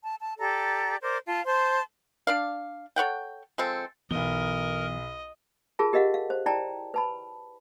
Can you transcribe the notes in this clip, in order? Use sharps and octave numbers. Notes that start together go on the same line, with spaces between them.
A5
A5
G4 A4 D5 A#5
A#4 C5 D5 D6
F4 F5 A5
C5 A5 C6
D4 D5 F5
A4 C#5 F#5 G5
F3 G#3 C4 A4
B1 E3 B3 A#4 D#5 G7
F4 G#4 A#4 A5
G4 A#4 D#5 F5 F#5
F5
C5
E4 D5 G5 A5 A#5
B4 A5 B5